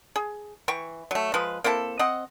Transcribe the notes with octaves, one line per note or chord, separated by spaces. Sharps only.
G#4
E3 G5 C#6
F#3 A3
F3 G#3 B4
A#3 C4 E4 A4
C4 D#5 F#5